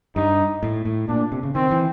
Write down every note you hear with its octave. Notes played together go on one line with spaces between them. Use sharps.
G2 D#4
A2
A2
A#2 D4
C3
C#3
D#3 C4
E3